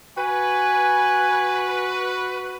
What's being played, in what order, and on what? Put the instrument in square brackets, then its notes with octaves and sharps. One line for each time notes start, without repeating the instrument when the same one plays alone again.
[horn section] F#4 B4 [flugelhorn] G#5